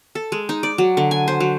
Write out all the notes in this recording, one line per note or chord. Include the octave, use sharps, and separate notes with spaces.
A4
G#3
D#4
D5
F#3
D3
G#5
C5
F#3